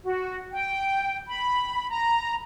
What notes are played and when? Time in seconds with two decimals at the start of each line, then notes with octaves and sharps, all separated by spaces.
0.05 F#4
0.53 G5
1.29 B5
1.90 A#5